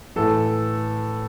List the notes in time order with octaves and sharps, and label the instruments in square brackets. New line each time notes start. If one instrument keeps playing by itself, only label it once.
[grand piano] A2 E3 A4